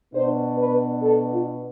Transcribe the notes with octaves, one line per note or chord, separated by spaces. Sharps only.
B2 B3 D4 C5
B4
A4
F4